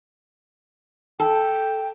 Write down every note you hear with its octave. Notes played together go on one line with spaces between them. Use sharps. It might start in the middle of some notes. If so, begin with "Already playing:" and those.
A4 G5